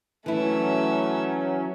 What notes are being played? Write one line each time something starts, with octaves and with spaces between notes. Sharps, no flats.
E3 F#3 A3 C#4 E4 E5